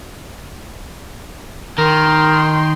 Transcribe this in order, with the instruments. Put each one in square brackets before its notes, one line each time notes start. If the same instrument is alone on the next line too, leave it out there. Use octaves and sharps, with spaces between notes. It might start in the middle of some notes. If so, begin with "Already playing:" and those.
[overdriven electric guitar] D#3 [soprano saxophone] A#4 [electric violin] G5 C6